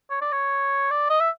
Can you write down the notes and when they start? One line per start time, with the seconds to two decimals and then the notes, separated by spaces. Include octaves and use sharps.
0.10 C#5
0.21 D5
0.32 C#5
0.91 D5
1.10 D#5
1.20 E5